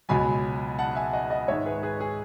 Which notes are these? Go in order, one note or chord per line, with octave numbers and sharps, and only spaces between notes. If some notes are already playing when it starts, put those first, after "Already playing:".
C#2 B2 F#3 G#5 B5
F#5 A5
E5 G#5
D#5 F#5
D#5 F#5
G#2 D#3 G#3 C#5 E5
G#4 B4
G#4 B4
G#4